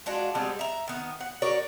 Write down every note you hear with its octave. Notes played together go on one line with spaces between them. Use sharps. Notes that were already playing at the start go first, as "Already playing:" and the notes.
G#3 D4 F4 F#4
G3 G#3 B3 C4
E5 A#5
D#3 B3
F#5
F#4 A#4 C#5 D5